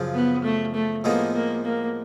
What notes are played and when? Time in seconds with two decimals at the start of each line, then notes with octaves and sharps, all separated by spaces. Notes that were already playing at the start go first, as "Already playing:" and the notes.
Already playing: F#2 C#3 F3
0.15 B3
0.44 A3
0.74 A3
1.04 A2 F3 G#3 A#3 B3 D#4
1.34 A#3
1.65 A#3